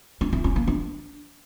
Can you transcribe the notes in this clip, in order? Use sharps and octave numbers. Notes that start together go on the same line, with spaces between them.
D4
E4
C#4
A#3
D4